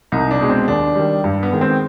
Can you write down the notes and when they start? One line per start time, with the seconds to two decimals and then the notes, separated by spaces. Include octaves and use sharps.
0.12 C2 D#4
0.31 D4
0.40 B2 G#3
0.49 C4
0.68 D#2 D4
0.96 D#3 G3
1.24 G2
1.43 B3
1.52 D#3 G#3
1.61 C4